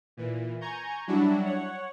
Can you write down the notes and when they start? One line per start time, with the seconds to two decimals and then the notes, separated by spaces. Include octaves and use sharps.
0.17 A#2 E3
0.61 G#5 A#5 C#6 G6 G#6
1.07 F#3 G3 D4 E4 F#4
1.45 C#5 F#5